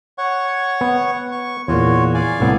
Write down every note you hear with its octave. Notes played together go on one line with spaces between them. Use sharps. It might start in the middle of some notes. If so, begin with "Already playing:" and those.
C#5 F#5 C#6
B3
C#6
E2 A#2 F4 F#4 C#5
D5 F5 G#5
C2 A2 B3